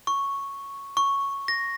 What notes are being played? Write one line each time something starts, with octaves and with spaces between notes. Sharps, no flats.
C#6
C#6
A#6